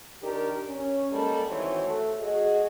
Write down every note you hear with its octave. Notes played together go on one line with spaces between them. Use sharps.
D#3 D4 G4 A#4
C#4
G3 G#3 A#3 A4
D#3 E3 C4 F#4 C5 C#5
A3
F#4 G#4 D#5